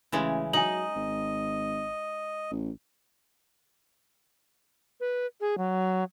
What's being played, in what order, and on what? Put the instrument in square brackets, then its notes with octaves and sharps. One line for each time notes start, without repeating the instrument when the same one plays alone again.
[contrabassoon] A1 [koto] C#3 E3 G#3
[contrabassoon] F#3 [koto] D#4 [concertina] D#5 [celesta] G#5 F#7
[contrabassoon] G#1
A1
[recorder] B4
G#4
F#3